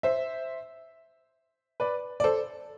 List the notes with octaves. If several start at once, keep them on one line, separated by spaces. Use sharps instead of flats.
C5 E5
B4 D5
D5
A4 C5